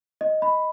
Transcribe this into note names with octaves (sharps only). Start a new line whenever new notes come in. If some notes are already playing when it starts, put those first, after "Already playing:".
D#5
B5